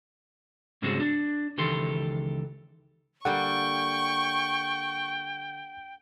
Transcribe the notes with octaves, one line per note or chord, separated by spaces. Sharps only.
G#2 C#3 G3 G#3 C4 F#4
D4
C#2 D#3 E3 G4 A4 C6
D3 G3 A#3 F#5 G5 C#6